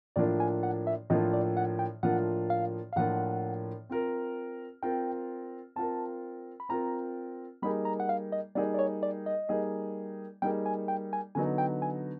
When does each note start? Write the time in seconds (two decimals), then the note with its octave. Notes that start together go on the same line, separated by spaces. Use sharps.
0.16 A2 F3 A#3 D4 F4 D5
0.40 G#5
0.63 F#5
0.87 E5
1.10 A2 F3 A#3 D4 F4 D#5
1.33 D5
1.57 F#5
1.79 G5
2.03 A2 F3 A#3 D4 F4 F#5
2.50 F5
2.93 F5
2.96 A2 F3 A#3 D4 F4 F#5
3.90 C4 F4 A#4
4.83 C4 F4 A#4 G5
5.76 C4 F4 A#4 A5
6.60 B5
6.69 C4 F4 A#4 A#5
7.62 G3 A#3 D#4 G#4 B5
7.85 A#5
8.00 F#5
8.09 F5
8.32 D#5
8.55 G3 A#3 D#4 G#4 D5
8.74 D5
8.79 C#5
9.03 D5
9.26 D#5
9.49 G3 A#3 D#4 G#4
10.42 G3 A#3 D#4 G#4 G5
10.66 G#5
10.88 G5
11.13 G#5
11.35 D3 F#3 B3 D#4 G#5
11.58 G5
11.82 G#5